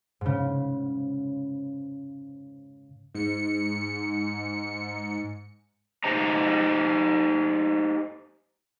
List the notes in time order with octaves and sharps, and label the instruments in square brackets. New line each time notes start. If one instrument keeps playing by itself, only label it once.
[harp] G#2 C#3
[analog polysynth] G#2 C#7
[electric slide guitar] D#4 G4 C5 D#5 A#5